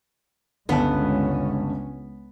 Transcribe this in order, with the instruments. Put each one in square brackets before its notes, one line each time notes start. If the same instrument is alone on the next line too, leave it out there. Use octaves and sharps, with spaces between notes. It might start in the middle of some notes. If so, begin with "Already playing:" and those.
[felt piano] G1 A5 [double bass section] C#2 G#3 C#4 [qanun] B3